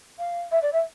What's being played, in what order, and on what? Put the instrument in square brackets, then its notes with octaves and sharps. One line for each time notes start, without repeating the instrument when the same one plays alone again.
[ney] F5
E5
D5
E5